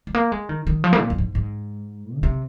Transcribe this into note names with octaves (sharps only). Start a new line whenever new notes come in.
G#3
A#3
G#3
D#3
D#3
F3
A#3
A#2
F2
G#2
G#2
D#3
C3